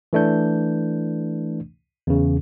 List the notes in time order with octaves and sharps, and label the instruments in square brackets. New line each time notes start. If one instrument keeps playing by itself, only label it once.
[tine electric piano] E3 A3 D4 G6
E2 C#3